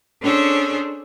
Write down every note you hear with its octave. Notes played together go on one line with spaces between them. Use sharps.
C#4 D4 G#4 A4 C5 C#5